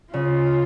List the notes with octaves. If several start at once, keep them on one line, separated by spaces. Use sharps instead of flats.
C#3 F4